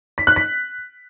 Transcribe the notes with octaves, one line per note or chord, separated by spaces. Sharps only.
B6
F#6
B6